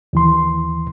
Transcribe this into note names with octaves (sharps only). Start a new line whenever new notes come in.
D#2 E3 C6